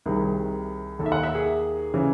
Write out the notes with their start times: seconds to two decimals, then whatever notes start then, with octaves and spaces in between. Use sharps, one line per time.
0.06 C2 C3 D#3 G#4
0.99 D#2 D#3 A4
1.06 E5
1.12 F#5
1.23 E5
1.35 G#4
1.94 C#3 E3